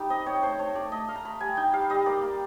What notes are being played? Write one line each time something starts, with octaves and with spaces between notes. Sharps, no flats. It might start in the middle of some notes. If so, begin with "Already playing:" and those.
Already playing: G3 D#4
C4 D#5
C4 C#5
A3 C5
A3 C#5
A3 D5
A3 D#5
A3 F5
A#5
A3 B5
G3 G#5
D#4 G5
G3 F5
G3 D#5
A#3 D5
A#3